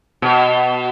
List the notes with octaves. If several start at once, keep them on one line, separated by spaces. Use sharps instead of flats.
B2